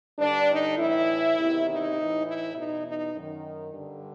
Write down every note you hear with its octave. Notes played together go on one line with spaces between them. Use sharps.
G2 D3 D4
D#4
A2 E3 E4
E2 C3 D#3
D#4
A2 E3
E4
E2 B2 D#4
D#4
F#2 D#3
G2 D3